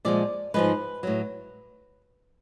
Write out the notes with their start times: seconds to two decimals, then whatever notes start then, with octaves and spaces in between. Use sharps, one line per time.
0.05 A#2 F3 G#3 D5
0.54 G#2 F3 G#3 B4
1.03 A2 F#3